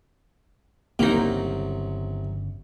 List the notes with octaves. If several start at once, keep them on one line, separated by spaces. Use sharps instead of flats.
G1 C2 C#3 F#3 A#3 D#4